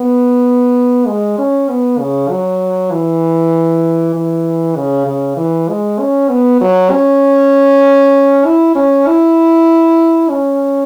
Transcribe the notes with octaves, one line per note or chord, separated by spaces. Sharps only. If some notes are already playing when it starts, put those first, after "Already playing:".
Already playing: B3
G#3
C#4
B3
C#3
F#3
E3
E3
C#3
C#3
E3
G#3
C#4
B3
F#3
C#4
E4
C#4
E4
C#4